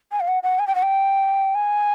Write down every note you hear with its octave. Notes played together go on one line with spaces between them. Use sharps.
G#5
F5
F#5
F#5
G#5
G5
F#5
G5
G#5